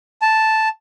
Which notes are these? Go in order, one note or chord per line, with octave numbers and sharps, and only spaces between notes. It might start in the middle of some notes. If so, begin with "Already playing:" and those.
A5